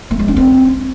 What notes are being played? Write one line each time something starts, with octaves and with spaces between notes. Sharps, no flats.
A3
G#3
D4
C4